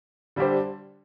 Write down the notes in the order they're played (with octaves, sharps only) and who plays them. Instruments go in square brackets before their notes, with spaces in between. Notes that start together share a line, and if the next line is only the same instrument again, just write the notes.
[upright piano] D3 G3 D4 G4 C5